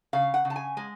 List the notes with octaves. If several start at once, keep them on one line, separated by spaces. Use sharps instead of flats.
C#3 F5
F#5
C#3
A5
G#5
G#3 G#5